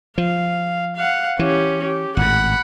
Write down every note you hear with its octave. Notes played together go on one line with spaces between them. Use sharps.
F3 F5
F5 F#5
E3 C#4 G4
G4
G#1 A2 F#5 B5